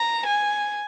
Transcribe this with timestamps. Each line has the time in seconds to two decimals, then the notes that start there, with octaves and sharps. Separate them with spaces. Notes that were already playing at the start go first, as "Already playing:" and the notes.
Already playing: A#5
0.26 G#5